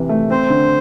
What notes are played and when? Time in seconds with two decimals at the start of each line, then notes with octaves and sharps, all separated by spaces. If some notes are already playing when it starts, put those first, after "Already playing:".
Already playing: C3 E3
0.09 A3
0.30 C4 C5
0.50 D3